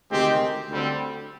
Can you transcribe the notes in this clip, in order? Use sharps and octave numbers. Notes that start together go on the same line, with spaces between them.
D2 C3 D#3 G#3 C4 G4 G5
D2 D3 G3 C4